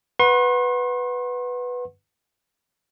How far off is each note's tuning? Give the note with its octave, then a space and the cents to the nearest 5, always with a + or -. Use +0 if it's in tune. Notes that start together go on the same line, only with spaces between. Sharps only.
B4 +0 F#5 -10 C6 +45